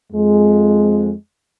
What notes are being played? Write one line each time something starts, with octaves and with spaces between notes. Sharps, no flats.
F2 G#3